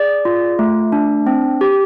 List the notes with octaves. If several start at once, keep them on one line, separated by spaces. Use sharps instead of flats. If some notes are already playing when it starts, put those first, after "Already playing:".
Already playing: G#4 D5
F4
A3
D4
C4
G4